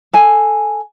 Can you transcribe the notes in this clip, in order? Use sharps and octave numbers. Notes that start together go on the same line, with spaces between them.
A4 G#5